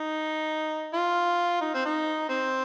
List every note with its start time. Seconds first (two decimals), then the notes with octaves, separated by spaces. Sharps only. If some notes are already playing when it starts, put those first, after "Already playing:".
Already playing: D#4
0.94 F4
1.61 D#4
1.74 C4
1.85 D#4
2.29 C4